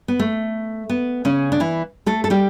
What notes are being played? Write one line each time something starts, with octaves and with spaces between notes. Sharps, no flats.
B3
A3
B3
C#3 C#4
D4
E3 E4
A3 A4
A4
G3 G4